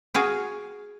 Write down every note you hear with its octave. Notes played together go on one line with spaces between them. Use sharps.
F#4 G#4 F5 G5